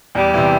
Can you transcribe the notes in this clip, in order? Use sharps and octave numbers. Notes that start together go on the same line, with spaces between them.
E2 G3
C3 E3